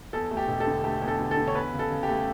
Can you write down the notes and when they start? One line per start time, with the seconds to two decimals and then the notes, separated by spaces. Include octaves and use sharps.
0.13 E2 A4
0.31 A3
0.37 G4
0.48 E1
0.60 A4
0.67 D3
0.84 A3 G4
1.02 E2
1.08 A4
1.19 D3
1.31 A4
1.37 D3
1.48 C#5
1.55 E2 B4
1.73 C#3
1.79 A4
1.91 C#3
2.03 G4
2.09 A3